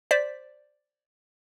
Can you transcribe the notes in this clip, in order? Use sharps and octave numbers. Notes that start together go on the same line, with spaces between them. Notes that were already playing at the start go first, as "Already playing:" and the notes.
C5 D5 B6